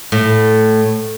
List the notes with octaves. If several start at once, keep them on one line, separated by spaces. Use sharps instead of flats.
A2